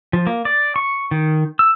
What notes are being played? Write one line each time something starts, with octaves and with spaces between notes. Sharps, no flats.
F3
A#3
D5
C#6
D#3
E6